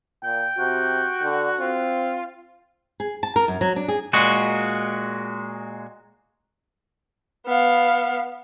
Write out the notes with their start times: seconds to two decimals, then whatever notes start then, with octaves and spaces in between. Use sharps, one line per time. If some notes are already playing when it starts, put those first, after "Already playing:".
0.24 A#2 G5
0.58 C3 F#4
1.23 D3
1.60 C4 F4
3.00 G#4
3.23 A5
3.36 A#4
3.48 F#2
3.61 F#3
3.76 D4
3.88 G#4
4.13 A#2 G#3 F#4
7.46 B3 F5